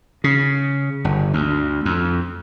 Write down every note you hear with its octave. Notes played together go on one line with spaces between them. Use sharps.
C#3
G1
D2
F2